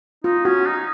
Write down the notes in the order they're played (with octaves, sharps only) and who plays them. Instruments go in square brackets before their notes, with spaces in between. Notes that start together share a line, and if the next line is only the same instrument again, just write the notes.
[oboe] D#4 [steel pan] F4
[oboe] C#4 [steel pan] F#4
[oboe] D#4